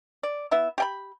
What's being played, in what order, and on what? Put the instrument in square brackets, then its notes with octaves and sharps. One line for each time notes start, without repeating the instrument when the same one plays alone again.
[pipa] D5
B3 E4 E5
G4 G5 B5